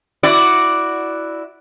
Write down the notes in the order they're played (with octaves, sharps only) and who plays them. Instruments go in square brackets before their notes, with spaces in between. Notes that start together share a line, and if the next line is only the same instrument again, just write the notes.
[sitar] E4 F#4 D5